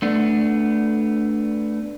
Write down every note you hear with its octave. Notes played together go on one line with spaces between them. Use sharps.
A3 B3 D4